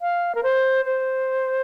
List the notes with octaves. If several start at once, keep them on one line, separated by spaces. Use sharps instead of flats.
F5
A#4
C5
C5